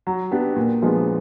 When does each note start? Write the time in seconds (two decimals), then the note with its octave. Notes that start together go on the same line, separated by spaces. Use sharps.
0.07 F#3
0.31 B3 D4 G4
0.56 A#2
0.82 F3 G#3 B3 D4